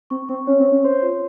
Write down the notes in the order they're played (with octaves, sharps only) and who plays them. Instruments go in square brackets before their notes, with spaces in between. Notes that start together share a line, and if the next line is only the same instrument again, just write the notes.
[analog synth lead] C4 [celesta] C#6
[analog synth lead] C4 [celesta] C#6
[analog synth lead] C#4 [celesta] C#5
[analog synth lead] C4
[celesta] C#5
[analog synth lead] C#4
[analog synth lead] C5 [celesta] C6
[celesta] F4